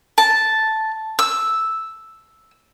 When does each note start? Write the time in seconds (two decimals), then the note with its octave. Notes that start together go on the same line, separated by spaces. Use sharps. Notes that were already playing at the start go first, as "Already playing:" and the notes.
0.18 A5
1.19 E6